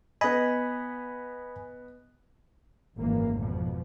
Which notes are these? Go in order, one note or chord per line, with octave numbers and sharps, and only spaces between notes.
B3 D#5 G#5 B5
G#1 F#2 E3 A#3
F2 B2 F3